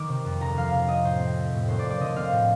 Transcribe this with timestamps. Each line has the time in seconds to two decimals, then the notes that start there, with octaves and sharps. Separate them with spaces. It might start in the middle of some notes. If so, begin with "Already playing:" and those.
Already playing: D#3 D6
0.09 C3
0.25 F2
0.41 D2 A#5
0.57 F3 F5
0.72 C3 F5
0.88 C4 D#5
1.04 A2 C5
1.21 C4
1.36 A3
1.53 A2
1.68 D#2 C5
1.79 D5
1.85 F3
1.90 D5
2.00 D3 D#5
2.16 C4 F5
2.32 A2